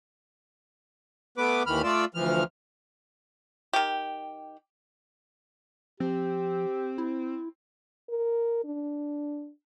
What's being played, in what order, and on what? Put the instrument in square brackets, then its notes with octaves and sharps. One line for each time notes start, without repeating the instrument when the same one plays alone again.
[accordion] A3 B3 B4 D6
D#2 D#3 E3 B5 F6
A3 F4 D5 E6
D2 E3 F3 F6
[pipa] D#3 G4
[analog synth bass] F3 [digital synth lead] C4 [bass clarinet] G4
[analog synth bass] E4
[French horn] A#4
D4